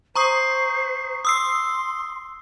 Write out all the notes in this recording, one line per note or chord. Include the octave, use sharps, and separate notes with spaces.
C5 A#5 C#6 D#6
C6 D#6 E6 C7